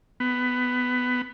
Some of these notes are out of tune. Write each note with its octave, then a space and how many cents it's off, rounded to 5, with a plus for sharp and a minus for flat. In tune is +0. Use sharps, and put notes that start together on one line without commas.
B3 +15